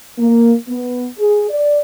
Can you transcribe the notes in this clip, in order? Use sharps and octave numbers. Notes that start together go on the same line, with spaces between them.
A#3
B3
G#4
D5